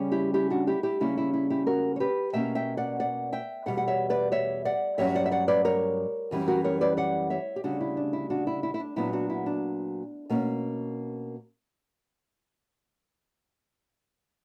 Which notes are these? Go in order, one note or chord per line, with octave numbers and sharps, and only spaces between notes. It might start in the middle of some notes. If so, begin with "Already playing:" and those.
Already playing: C#3 G3 C#4
E4 G4
E4 G4
D4 F#4
E4 G4
E4 G4
C#3 G3 A#3 C#4 E4
E4
E4
E4 G4
F#4 A#4
C#5
G4 B4
B2 A#3 C#4 E5 G5
E5 G5
D5 F#5
D5 F#5
E5 G5
E2 B2 G3 F#5
F#5
C#5 E5
B4 D5
C#5 E5
D5 F#5
G2 F#3 C#4 C#5 E5
D5 F#5
E5
D5 F#5
B4 D5
A#4 C#5
F#2 E3 G3 C#4
F#4 A#4
A#4 C#5
B4 D5
D5 F#5
C#5 E5
G4
D2 C#3 G3 D4 F#4
E4
D4
E4
D4 F#4
E4
E4
E4
D4
A#2 F#3 B3 D4 E4
D4 F#4
E4
D4
B2 A#3 C#4